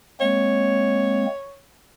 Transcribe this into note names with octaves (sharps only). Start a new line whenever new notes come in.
G#3 A#3 C4 C#5